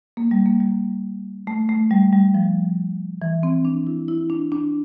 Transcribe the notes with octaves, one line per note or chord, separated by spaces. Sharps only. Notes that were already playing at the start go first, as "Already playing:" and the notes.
A#3
G3
A#3
G3
A3
A3
G3
G3
F3
E3
C4
D4
E4
E4
D4
D4